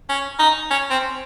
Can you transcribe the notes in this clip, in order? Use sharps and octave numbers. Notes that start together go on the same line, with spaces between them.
C#4
D#4
C#4
C4